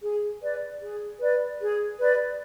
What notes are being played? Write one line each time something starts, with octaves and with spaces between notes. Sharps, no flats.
G#4
B4 D5
G#4
B4 D5
G#4
B4 D5